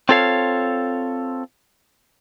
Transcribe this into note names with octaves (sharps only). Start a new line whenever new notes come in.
C4 F4 A4 C#5 F5